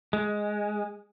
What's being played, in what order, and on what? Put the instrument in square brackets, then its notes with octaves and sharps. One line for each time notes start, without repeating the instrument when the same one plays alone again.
[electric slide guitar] G#3